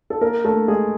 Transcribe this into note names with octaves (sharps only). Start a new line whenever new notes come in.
A4
A#3 A#4
A3 A4
G#3 G#4